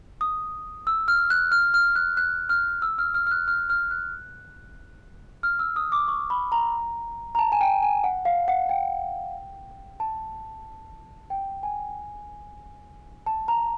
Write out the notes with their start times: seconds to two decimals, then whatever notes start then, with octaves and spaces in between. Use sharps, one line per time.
0.21 D#6
0.87 E6
1.08 F6
1.30 F#6
1.52 F6
1.74 F6
1.96 F#6
2.17 F#6
2.49 F6
2.82 E6
2.98 F6
3.14 F6
3.27 F6
3.31 F#6
3.48 F6
3.70 F6
3.91 F#6
5.43 F6
5.59 E6
5.76 D#6
5.92 D6
6.08 C#6
6.30 B5
6.52 A#5
7.35 A#5
7.39 A5
7.52 G#5
7.61 G5
7.83 G#5
8.04 F#5
8.25 F5
8.48 F#5
8.69 G5
10.00 A5
11.30 G5
11.63 G#5
13.26 A5
13.48 A#5